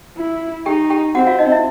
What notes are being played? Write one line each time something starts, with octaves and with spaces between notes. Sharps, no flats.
E4
D#4 G4 G5
G4 G5
C4 F#4 F#5
F4 F5
D#4 D#5
E4 E5